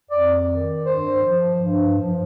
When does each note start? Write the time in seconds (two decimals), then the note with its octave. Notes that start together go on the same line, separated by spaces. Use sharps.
0.10 F2 D5
0.48 D#3
0.85 G2 C5
1.23 F3
1.61 G2
1.98 F3